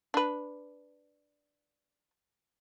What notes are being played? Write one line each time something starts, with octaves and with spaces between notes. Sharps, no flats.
D4 B4